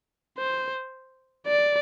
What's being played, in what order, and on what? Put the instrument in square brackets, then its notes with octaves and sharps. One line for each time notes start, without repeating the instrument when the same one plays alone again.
[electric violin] C5
D5